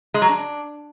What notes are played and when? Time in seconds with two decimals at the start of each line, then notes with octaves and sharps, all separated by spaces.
0.14 G#3
0.22 F#3
0.29 D4